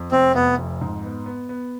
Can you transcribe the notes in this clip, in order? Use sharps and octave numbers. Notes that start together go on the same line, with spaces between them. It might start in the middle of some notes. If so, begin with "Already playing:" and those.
Already playing: F2
F1 C4
F1 B3
F2
G#2
B3
B3
B3